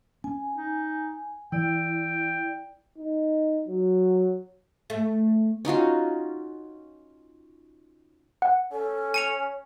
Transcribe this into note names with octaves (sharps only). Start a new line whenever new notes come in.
C#4 G#5
D#4
E3 E4 D5 G5
D#4
F#3
A3
C#4 D#4 F4 F#4
F#5
C#4 A4
G#5 C#7 F7